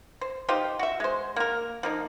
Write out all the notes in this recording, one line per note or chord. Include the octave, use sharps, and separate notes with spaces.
C5
D#4 F4 G4 C5
F#4 E5
G#3 C5
A#3 A#4
F3 A#3 D#4